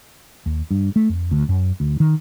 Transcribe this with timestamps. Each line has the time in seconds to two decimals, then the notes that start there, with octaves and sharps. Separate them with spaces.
0.46 D#2
0.71 G2
0.96 A3
1.09 F2
1.31 D2
1.49 F#2
1.80 D2
2.00 D#3